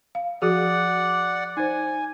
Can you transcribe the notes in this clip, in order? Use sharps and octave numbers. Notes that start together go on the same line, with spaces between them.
F5
F3 F#4 G#4 D5 F#5
D#4 C5 G#5